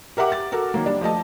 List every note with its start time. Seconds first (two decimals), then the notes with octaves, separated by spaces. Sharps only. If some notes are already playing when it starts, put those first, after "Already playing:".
0.17 G4 A#4 E5 F#5 D6
0.32 A6
0.52 F#4 A4 A#4
0.74 D#3 F#3 A#3
0.86 G3 D4
1.01 F3 A3 D#5 A5